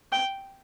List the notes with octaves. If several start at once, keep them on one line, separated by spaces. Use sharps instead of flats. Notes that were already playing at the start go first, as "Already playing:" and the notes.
G5